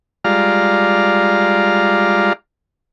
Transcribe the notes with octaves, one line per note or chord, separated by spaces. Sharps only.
G3 G#3 F4 D5 F5 A#5